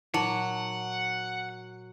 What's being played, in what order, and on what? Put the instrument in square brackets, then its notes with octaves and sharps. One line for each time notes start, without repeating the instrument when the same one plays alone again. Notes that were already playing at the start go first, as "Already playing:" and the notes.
[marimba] A#2 [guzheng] F#3 [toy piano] D#4 [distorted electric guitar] F#5